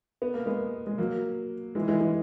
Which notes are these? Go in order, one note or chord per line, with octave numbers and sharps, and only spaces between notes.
B3
A#3
G#3 B3
G#3
F#3 A#3
E3 G#3
E3 G#3
E3 G#3